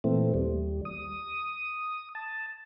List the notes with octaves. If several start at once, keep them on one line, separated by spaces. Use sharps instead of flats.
A#2 E3 A3 C4
D#2 G3
D#6
A5